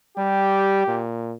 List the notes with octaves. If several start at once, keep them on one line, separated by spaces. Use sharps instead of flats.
G3 G4
A#2